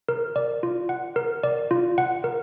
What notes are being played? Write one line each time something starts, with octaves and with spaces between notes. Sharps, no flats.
A#4
D5
F4
F#5
A#4
D5
F4
F#5
A#4